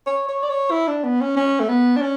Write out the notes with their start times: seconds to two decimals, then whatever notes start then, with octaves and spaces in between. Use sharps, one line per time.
0.07 C#5
0.28 C#5
0.43 D5
0.49 C#5
0.71 E4
0.88 D4
1.04 B3
1.21 C#4
1.37 C#4
1.60 A3
1.69 B3
1.96 D4
2.02 C#4